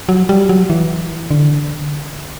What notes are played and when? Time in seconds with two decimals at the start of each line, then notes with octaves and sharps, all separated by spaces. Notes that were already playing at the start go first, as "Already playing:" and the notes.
0.09 F#3
0.29 G3
0.49 F#3
0.70 E3
1.31 D3